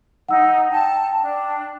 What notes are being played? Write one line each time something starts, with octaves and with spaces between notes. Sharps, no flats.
D#4 F#5 E6
G5 A5
D4